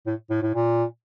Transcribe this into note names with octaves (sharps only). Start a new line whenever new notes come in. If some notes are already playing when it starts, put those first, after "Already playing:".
A2
A2
A2
A#2